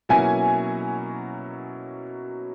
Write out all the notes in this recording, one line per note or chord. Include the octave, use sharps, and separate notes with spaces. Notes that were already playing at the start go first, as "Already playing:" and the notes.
B2 F#3 A#3 C#4 E4 G#5